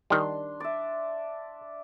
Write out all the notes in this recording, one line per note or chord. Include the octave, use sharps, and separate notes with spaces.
D#3 G3 D4 C6
D5 E5